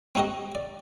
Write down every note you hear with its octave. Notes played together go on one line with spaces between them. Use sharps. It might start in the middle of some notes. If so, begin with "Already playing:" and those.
C4 D#4 F#4 G4 D#5
D5